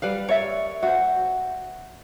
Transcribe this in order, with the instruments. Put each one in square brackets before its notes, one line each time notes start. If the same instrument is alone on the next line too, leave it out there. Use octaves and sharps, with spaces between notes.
[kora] G3 B4 F5
[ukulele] A#4 D5 E5 [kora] C#5
[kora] F#4 [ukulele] C5 E5